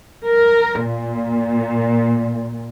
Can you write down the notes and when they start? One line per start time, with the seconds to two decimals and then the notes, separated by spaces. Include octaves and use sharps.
0.24 A#4
0.83 A#2